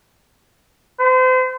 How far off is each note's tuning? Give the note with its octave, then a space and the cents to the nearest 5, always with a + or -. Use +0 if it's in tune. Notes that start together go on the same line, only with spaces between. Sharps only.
C5 -35